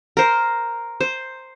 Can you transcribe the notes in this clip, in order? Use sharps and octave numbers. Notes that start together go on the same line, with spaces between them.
A#4 C5
C5